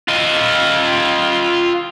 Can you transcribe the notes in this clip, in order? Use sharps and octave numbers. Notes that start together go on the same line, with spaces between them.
F4 D#5